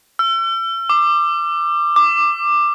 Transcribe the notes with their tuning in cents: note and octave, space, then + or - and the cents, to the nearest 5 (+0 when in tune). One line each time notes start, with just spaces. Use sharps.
E6 +40
D6 +20
D6 +10